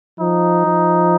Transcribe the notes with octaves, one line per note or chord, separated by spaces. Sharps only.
F3 D#4
F3